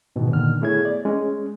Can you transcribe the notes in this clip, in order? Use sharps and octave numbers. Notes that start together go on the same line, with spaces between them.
G#2 B2 D#3 E3
A#2 D3 D#3 F6
A3 B3 E4 G#4 C#5 G#6
D5
G#3 C#4